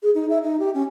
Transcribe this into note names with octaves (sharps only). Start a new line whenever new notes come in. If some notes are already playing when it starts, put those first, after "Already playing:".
G#4
D#4
E5
D#4
G4
C#4